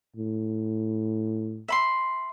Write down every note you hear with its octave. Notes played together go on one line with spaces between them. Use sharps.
A2
E5 B5 C6